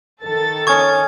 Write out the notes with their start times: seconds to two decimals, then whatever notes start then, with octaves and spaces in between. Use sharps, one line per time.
0.24 D#3 A4 A6
0.67 C#4 C#6 D#6 G#6